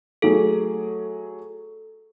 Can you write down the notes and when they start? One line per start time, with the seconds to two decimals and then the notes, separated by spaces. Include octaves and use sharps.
0.22 F#3 A3 G#4 A4